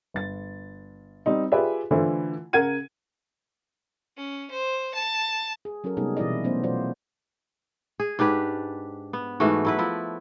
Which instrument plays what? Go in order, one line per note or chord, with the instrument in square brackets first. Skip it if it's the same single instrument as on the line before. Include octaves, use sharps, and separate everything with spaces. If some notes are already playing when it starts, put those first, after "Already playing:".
[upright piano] G1 A6
G3 C4 D#4
F4 G4 G#4 B4 D5 E5
D3 E3 A3 E4 F4 C5
C#3 A#4 F#5 G#6 D#7
[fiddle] C#4
C5
A5
[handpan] G#4
F#3 C#4 F#4 A4 A#4
C3 G3 G#3 B3 D#4 G#4
B2 E3 E4 D5 D#5
F#3 A3 B3 C#4 C5
B2 F#3 F4 C5 D5
[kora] G#4
G#2 D4 G4 B4
B3
G#2 E3 A3 F#4
F#3 E4 B4
F3 E4